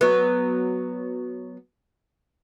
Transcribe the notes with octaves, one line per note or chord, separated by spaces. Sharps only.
F#3 B3